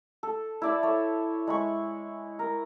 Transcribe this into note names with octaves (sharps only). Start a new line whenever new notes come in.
A4
E4 D5 E5
A4 C#5
G#3 B5 C#6
A#4